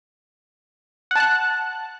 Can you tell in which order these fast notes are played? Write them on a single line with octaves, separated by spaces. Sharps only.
F#5 A5 F#6